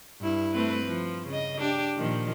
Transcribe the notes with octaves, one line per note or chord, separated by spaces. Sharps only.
G2 E4
A3 C4 B4
F3
C#3 D#5
D4 G4
A#2 D#3 F3